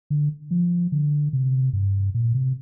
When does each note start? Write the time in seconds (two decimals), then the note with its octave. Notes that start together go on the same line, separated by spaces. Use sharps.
0.10 D3
0.51 F3
0.92 D3
1.33 C3
1.73 G2
2.14 A#2
2.34 C3